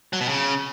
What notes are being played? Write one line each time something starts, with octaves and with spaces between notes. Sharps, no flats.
F#3
B2
C#3